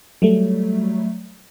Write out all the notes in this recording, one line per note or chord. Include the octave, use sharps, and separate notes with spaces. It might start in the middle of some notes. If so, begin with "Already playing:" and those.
F#3 G3 A3